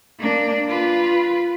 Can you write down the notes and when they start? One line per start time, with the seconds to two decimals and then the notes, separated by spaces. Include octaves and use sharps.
0.19 A#3 D4
0.68 F4 B4